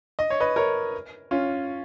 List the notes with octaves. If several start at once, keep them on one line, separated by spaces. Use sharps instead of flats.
D#5
C#5
B4 D#5
A#4 C#5
C#4 F4